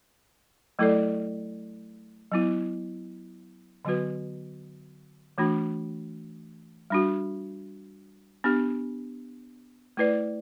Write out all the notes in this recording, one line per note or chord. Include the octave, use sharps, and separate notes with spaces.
F#3 A3 E4 A4 D5
F#3 B3 E4
D3 F#3 B3 F#4 B4
E3 A3 D4 F#4
G3 D4 F#4
B3 D4 G4
A3 E4 B4 D5